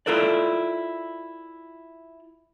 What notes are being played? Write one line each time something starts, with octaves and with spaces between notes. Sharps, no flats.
E4 F4 A4 A#4 D5